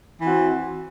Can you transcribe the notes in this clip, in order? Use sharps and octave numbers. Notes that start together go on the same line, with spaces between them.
E3 C4 F#4